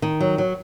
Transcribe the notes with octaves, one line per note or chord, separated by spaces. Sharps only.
D#3
F#3
F#3